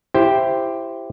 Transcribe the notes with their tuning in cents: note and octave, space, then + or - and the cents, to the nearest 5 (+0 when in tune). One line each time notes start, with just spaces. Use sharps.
E4 +15 G4 +0 C5 +0